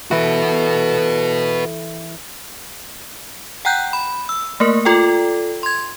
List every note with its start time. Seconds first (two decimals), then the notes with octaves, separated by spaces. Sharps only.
0.11 E3 F#4 A4 B4
3.65 F#5 G5 A#5 F#6 G6
3.93 B5
4.29 E6
4.60 A3 A#3 A#4
4.85 F4 A4 D5 G5
5.63 C6 G#6